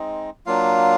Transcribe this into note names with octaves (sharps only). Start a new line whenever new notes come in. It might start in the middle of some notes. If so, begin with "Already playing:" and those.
Already playing: G#3 C4 D#4
F#3 A#3 D4 F4 F5